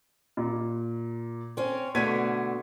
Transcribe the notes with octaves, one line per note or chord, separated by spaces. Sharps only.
A#2
C4 C#4
B2 D3 A3 G#6 B6 D#7